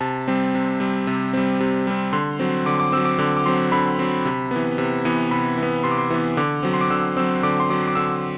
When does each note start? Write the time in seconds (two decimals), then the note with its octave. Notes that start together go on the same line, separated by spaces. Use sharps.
0.01 C3 A5
0.28 G3 C4
0.55 C3
0.80 G3 C4
1.07 C3
1.33 G3 C4
1.60 C3
1.87 G3 C4
2.13 D3 C6
2.39 F#3 C4
2.66 D3 D6
2.80 D6
2.92 F#3 C4 E6
3.05 D6
3.18 D3 D6
3.37 D6
3.46 F#3 C4 C6
3.72 D3 B5
3.99 F#3 C4
4.25 C3
4.51 E3 B3
4.78 C3
5.05 E3 B3
5.31 C3 B5
5.57 E3
5.63 B3
5.84 C3 C6
5.91 D6
5.98 C6
6.10 E3 B3
6.37 D3 D6
6.63 F#3 C4
6.74 C6
6.81 D6
6.90 D3 E6
7.17 F#3 C4 E6
7.43 D3 D6
7.60 C6
7.70 F#3 C4 D6
7.88 D6
7.95 D3 E6